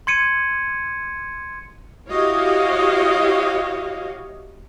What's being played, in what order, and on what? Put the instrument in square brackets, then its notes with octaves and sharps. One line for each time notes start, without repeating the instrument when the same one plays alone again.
[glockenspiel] C6 G#6 C#7 D#7
[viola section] E4 F#4 G4 C#5 D#5 F5